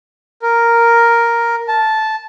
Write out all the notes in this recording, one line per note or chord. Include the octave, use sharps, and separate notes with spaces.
A#4
A5